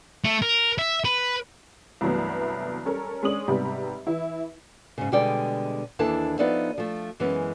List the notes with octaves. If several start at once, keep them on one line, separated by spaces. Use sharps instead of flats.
A3
A#4
E5
B4
C2 G2 E3 F#3 A3 B3
G3 C#4 A4 A#4
G#3 C#4 D4 D#6 F#7
G#2 C3 G3 B3 G4
E3 E4
G#2 C#3
B2 D3 G3 G#3 D5 G5
D#2 E3 D4 E4 A4 A5
F3 B3 D#4 D5 E5
F3 A3
F#2 E3 G#3 B3 C#4